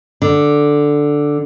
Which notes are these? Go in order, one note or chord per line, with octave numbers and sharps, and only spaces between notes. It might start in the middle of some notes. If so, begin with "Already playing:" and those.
D3